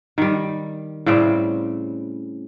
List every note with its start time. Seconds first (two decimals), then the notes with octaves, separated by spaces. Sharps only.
0.18 D#3 G3
1.06 A2 C#3 G3 C4